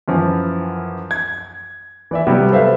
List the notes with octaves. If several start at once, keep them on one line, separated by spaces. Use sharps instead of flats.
F#2 E3 F3
G#6
E3 D5 E5
C3 F#3 G3 B3 G4
A4 B4 C5 E5 F5